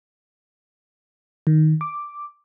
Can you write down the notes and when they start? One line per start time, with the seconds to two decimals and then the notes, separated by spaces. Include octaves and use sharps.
1.47 D#3
1.81 D6